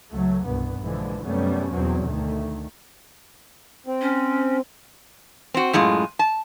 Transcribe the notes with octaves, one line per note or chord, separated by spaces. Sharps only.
C#2 F#3 A3
C2 G2 B2 B3
A#1 D3 E3 F3 G#3
F#2 C3 G3 A3 B3 C#4
E2 G2 B2 F#3 C4
D2 D#3 A3
C4
C#4
C4 F#4
F#2 A2 G#3 F4
A5